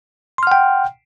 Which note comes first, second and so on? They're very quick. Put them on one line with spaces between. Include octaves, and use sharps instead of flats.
C6 F6 F#5 G5